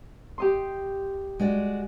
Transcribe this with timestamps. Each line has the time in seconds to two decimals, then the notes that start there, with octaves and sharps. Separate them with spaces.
0.38 G4 D#5 C6
1.39 G#3 F#4 D5